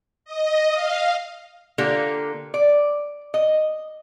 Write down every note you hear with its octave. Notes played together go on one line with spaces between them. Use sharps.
D#5
F5
D3 A#3 F4 G4 A4
D5
D#5